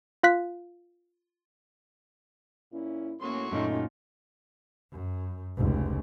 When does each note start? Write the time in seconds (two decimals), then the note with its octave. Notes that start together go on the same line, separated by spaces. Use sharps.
0.23 F4 F5 F#6 B6
2.73 A#2 C#4 E4
3.21 A2 F#3 A#3 C#4 C6 C#6
3.52 F#2 A#2 A3 C#4 D#4 F4 D#5
4.92 F#2
5.57 F1 C#2